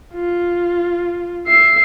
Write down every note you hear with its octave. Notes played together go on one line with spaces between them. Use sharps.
F4
E5 C7